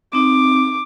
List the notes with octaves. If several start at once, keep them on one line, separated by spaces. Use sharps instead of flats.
C4 D#4 D6